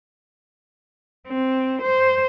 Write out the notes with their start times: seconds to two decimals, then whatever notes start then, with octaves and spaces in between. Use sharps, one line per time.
1.28 C4
1.81 C5